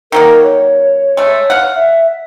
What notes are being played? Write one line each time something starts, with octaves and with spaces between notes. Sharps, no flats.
D#3 F#3 A#3 A#4
C#5
G#3 A3
F5 F#5
E5